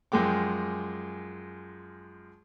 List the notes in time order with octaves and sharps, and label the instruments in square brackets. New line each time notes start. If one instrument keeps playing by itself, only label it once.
[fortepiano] F#2 F3 G#3 G5 D6